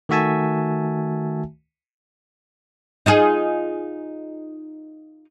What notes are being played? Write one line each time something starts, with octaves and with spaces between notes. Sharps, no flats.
D#3 A3 F#4 E5 G#5 A5
D#4 F4 G#4